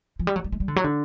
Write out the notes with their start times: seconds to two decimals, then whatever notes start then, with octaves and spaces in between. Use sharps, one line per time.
0.19 F3
0.27 G3
0.36 F#3
0.44 G3
0.52 G#3
0.60 G3
0.68 D3
0.76 F#3
0.84 D3